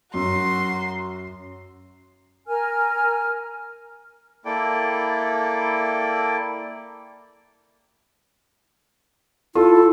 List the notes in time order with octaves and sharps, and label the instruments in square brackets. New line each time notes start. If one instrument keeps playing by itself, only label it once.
[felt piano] F#2 [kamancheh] F#4 C6
[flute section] A#4 G#5 F6
[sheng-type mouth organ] A#3 E4 A4 D5 G5
[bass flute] E4 [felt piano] F4 [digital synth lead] A4